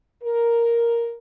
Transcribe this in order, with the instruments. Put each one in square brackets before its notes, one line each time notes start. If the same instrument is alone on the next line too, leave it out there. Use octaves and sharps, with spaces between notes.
[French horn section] A#4